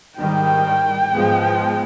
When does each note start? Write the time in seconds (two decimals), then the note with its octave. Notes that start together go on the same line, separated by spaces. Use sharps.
0.19 G#2 D#3 G3 G5
1.13 G#2 F3 G#3 B3